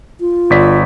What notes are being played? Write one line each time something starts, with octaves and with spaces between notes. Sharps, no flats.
F4
G1 D5 B6